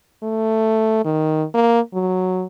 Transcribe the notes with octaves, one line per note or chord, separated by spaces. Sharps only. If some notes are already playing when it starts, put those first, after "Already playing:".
A3
D#3
A#3
F#3